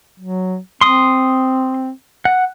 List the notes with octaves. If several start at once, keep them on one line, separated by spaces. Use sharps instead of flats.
F#3
C4 C6 D#6
F#5